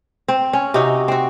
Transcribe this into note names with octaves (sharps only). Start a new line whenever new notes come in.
C4
C#4
C3 D#4 F#4
C4 F#4